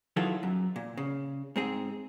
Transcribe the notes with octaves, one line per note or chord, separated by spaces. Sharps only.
D#3 E3 F#3 F4 G#4 A4
F#2
A#2
C#3
G#2 C4 G#4